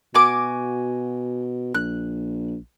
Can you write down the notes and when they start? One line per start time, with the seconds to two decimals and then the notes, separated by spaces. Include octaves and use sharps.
0.15 B2 F#4 G#5 D6
1.75 A#1 F#6